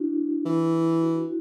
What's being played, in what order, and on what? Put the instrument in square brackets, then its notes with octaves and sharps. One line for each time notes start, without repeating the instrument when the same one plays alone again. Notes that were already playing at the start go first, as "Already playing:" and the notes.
Already playing: [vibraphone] D4 E4 F#4
[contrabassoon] E3
[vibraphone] F#4
E4
F#4